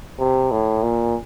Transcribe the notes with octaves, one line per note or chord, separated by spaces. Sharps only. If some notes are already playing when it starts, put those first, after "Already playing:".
C3
A2
A#2